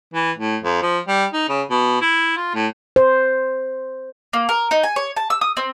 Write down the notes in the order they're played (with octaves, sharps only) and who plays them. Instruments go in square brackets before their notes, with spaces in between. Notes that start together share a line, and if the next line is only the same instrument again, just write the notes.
[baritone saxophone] E3
A2
F2
F3
G3
D#4
C#3
B2
E4
F4
A2
[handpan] C5
[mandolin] A#3
A#4
D#4
G#5
C#5
A5
E6
D#6
C4